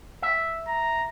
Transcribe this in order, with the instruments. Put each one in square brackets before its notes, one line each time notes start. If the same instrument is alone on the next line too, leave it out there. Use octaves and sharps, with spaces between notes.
[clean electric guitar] E5
[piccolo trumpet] A#5